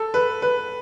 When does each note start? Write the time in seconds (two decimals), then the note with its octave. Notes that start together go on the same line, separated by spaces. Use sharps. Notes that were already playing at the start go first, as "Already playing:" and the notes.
Already playing: A4
0.14 B4
0.42 B4